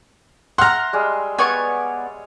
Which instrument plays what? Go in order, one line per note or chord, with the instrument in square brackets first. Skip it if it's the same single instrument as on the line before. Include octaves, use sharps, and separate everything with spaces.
[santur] E5 [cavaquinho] F#5 A#5 [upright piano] C6 F6
[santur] G3 G#3 G#4
[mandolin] B3 D5 C#6 [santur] C#5 [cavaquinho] G#5